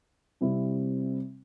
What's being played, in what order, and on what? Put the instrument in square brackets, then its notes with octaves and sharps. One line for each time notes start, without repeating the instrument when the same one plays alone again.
[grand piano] C3 G3 C4 E4